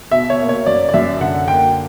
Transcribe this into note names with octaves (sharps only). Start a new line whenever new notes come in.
B2 E5
C#5
A#3
C#5
F#2 D5
D5
F#2 E5
D3 F#5
A#3 G5